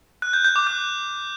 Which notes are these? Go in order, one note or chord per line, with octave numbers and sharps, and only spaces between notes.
F#6
G6
G6
D6
F#6